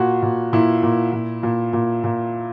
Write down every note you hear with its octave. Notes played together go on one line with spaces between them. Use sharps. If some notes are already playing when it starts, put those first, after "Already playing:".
Already playing: A#2 F#4
A#2
A#2 E4
A#2
A#2
A#2
A#2
A#2